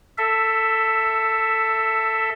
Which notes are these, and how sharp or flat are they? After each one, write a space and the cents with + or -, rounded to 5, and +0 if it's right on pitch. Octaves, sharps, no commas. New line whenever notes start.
A4 +15 E5 +0